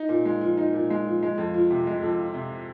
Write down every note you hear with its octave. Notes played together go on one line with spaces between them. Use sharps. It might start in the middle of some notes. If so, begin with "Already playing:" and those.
Already playing: D#4
A#2
G#3
F3
D#4
A#2
G#3
F3
G#3
F2
F3
C3
G#3
F2
F3
C3